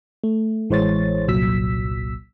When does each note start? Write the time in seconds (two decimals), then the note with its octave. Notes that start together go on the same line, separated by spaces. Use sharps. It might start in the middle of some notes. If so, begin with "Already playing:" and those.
0.24 A3
0.70 A1 E3 G#3 C5 C#5 A6
1.28 G1 C2 A#2 F#3 E6 B6